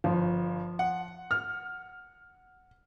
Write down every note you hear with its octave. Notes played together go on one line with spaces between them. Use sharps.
G1 F3
F#5
F6